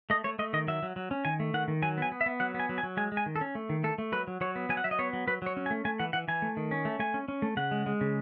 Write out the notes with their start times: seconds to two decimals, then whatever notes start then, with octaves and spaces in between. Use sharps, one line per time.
0.10 A3 D#5
0.24 A3 C#5
0.39 A3 D#5
0.53 D#3 D#5
0.67 F#3 E5
0.83 F#3
0.96 F#3
1.11 C#4
1.25 D#3 G#5
1.40 A3
1.54 D#3 F#5
1.68 D#3
1.82 F#3 G#5
1.98 B3 G#5
2.12 B3
2.21 E5
2.26 B3
2.40 F#3 F#5
2.54 B3
2.60 G#5
2.69 F#3
2.78 G#5
2.83 F#3
2.97 G#3 G#5
3.12 G#3
3.17 G#5
3.26 D#3
3.36 A4
3.41 C#4
3.55 A3
3.69 D#3
3.83 A3 A4
3.98 A3
4.12 F#3 B4
4.27 F#3
4.41 F#3 C#5
4.56 B3
4.69 F#3 G#5
4.77 F#5
4.84 F#3 E5
4.91 D#5
4.99 B3 C#5
5.13 F#3
5.27 F#3 B4
5.42 F#3 C#5
5.57 C#4
5.66 G#5
5.70 A3
5.85 A3 G#5
5.99 E3 F#5
6.13 E3 F#5
6.28 E3 G#5
6.42 A3
6.57 D#3
6.71 C#4
6.85 A3
6.99 A3 G#5
7.14 C#4
7.28 C#4
7.42 A3
7.57 C#3 F#5
7.71 G#3
7.86 G#3
8.01 C#3